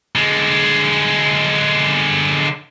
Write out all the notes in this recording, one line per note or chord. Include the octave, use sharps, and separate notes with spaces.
D3 G#3